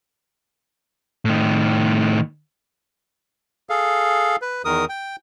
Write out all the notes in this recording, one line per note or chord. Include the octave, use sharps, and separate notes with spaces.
A2 D#3
G#4 A4 F5
B4
E2 D#3 A#4 D#6
G5